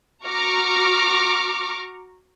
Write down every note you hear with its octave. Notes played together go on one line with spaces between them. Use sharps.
F#4 A#5 C#6 D6 F6